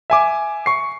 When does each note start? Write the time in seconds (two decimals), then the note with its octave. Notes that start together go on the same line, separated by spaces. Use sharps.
0.10 E5 G#5 D6
0.66 C#6 C7